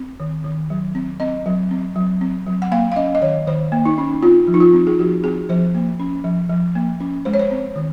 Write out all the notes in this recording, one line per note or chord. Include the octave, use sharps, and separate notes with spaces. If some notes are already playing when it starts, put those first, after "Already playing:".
Already playing: C4
D#3
D#3
F#3
C4
C4 D#5
F#3
C4
F#3
C4
F#3
F#5
A#3 F5
F5
C#4 D#5
D#5
D#3 C#5
D#3 C5
A#3
D#4
C#4
C4 F4
F3
D#4
F4
C4
G#4
F3 F#4
C4 G#4
F3 C5
A#3
C#4
F3
F3
A#3
C#4
G#3 C5
C#5
C5
C4
D#3